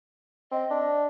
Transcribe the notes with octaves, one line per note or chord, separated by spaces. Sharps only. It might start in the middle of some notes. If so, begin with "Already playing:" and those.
C4 D#5
D4